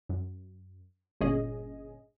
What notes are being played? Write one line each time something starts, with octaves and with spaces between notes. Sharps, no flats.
F#2
G1 G2 A#2 C#4 G#4 D#5